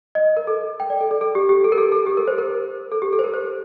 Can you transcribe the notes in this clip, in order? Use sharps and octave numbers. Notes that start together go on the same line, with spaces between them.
D#5
A#4
A4
G5
D5
A4
A4
A4
G4
G4
A4
A#4
A4
A4
G4
A#4
C5
A#4
A4
G4
A4
C5
A#4
C5